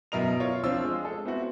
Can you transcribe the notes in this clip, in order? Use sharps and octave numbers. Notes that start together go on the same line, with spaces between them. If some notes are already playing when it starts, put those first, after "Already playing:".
F#2 B2 E4 A#4 D#5 F7
F4 C#5
F3 C4 D4 F4 C5 E6
G#3
A4
B3 C4 E4 F#4